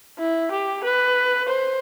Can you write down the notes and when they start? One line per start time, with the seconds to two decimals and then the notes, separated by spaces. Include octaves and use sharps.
0.19 E4
0.52 G4
0.84 B4
1.48 C5